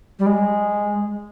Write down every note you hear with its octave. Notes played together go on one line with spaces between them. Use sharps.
G3
G#3